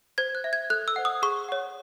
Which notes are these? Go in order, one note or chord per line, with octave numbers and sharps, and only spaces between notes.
C5 G#6
F#6
E5
G#6
A4 F#6
E6
C5 D#5 F#5
D#6
G#4 C#6
C#5 F#5